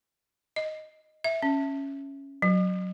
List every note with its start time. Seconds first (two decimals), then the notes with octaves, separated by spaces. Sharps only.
0.56 D#5
1.24 E5
1.42 C#4
2.42 F#3